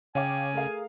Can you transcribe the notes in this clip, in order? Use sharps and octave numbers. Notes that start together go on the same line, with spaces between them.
C#3 C#5 F5 G5 G#5 D6
A3 G#4 A#4 F5